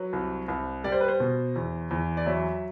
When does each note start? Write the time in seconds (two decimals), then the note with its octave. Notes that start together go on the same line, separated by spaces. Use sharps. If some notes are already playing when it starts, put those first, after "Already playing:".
Already playing: F#3 B4
0.13 C2
0.48 C2
0.84 G3 D5
0.92 C5
1.01 B4
1.08 C5
1.20 B2
1.56 E2
1.91 E2
2.17 D5
2.26 F#3 E5